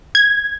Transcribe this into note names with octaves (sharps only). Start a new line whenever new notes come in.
G#6